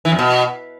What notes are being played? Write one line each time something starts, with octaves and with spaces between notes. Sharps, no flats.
E3
F2
B2